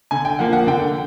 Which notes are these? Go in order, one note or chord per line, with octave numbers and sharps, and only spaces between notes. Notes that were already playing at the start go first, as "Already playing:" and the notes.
D3 G#5
G5
F3 A#3 F#5
F#5
D3 G5